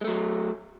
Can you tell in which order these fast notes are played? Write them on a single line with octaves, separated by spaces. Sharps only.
G#3 A3 F#3